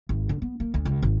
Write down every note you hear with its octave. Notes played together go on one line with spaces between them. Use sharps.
G#1
D3
B3
A#3
D2
C#2
G#1